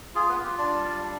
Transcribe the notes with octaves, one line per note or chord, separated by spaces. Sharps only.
F4 G#4
B3 B4
F4 G4
D4 D5
G3
D4